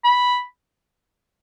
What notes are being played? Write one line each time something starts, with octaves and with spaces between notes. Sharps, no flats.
B5